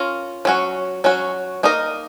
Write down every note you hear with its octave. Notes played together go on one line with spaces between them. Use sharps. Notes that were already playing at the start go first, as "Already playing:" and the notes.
Already playing: C#4 F4 A#4
F#3 C#4 F#4
F#3 C#4 F#4
A#3 D#4 A#4 D#5